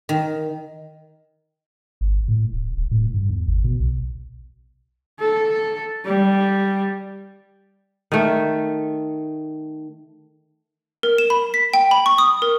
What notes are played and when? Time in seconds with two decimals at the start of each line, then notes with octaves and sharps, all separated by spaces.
0.09 D#3
2.01 G1
2.28 A2
2.53 D1
2.77 D#1
2.91 A2
3.14 G2
3.29 E2
3.47 G1
3.64 B2
3.80 B1
5.20 A4
6.05 G3
8.12 D#3 A3
11.03 A#4
11.18 E7
11.30 B5
11.54 B6
11.74 G5
11.91 B5
12.06 C#6
12.18 D#6
12.42 A#4